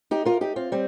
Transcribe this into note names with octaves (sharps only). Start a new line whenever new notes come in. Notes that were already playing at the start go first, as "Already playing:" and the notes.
D#4 G4
F4 A#4
D#4 G4
C4 F4
G3 C4